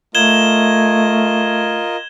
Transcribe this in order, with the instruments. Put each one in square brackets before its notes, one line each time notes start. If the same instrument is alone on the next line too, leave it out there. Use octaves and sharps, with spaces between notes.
[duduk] A3 [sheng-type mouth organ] F4 A#4 D#5 [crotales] G#6 E7 G7